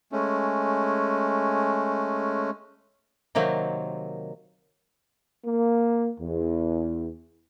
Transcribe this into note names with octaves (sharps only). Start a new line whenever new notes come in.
G#3 A3 C#4
C3 D#3 F#3 A#3 C4
A#3
E2